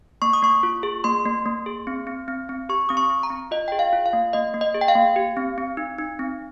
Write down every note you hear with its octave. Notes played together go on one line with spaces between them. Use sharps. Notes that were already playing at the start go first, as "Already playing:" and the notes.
A#3 C#6
D#6
A#3 C#6
F4
G#4
A#3 C6
A#3
A#3
G#4
C4
C4
C4
C4
G4 C#6
C4 D#6
C#6
C4
A#5
C4
F4 D#5
G#4 G5
F5
F4
F5
A#3
A#3 D#5
A#3
D#5
G#4
G5
F5
A#3
G4
C4
C4
D#4
D#4
C4